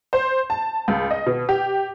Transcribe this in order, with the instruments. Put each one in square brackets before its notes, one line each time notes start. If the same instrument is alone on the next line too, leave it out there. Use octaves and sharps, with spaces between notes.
[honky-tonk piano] C5
A5
C#2
D#5
B2
G4